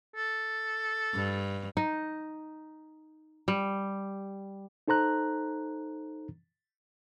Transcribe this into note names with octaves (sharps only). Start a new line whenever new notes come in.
A4
G2
D#4
G3
D#4 A4 C5 A#5 F#6